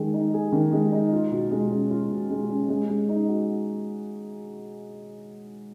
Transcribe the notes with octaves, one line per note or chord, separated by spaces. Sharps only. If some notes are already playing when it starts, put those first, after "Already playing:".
Already playing: D#3 G#3 G#4
D#4
G#4
D#3
G#3
D#4
F4
B2
G#3
C#4
F4
B2
G#3
C#4
G#3
G#3
D#4
F#4